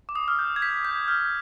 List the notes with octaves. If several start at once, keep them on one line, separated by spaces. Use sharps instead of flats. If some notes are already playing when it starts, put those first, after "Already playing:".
D6
D#6
F6
G6
G#6
B6
G6
F6